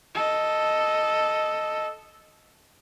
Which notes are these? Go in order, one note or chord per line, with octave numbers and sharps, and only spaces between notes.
A4 D#5